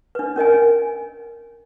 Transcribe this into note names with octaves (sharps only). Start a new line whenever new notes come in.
D4 B4
C#4 A#4 D#5 G#5